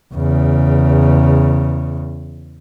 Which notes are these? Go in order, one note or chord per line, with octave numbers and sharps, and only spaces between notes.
E2 C#3